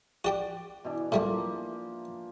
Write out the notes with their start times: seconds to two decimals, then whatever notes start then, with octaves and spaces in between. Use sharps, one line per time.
0.25 F#4 G4 D5 G5
0.85 B2 E3 D4
1.12 A2 F3 G3 A3 A#3